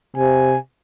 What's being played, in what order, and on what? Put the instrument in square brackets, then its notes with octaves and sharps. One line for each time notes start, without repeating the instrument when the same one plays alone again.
[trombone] C3 [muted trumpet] G#5